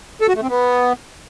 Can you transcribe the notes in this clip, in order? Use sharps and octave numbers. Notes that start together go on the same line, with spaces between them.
A4
F#4
A3
C4
B3